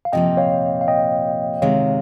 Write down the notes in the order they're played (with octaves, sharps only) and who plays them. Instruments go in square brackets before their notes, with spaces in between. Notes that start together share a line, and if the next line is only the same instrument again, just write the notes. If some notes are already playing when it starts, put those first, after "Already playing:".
[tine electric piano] F5
[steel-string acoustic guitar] C3 F3 A#3 [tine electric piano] D#5 G5
[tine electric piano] C#5 F5
F5
D#5 G5
[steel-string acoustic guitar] C3 D#3 G#3 [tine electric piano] C#5 F5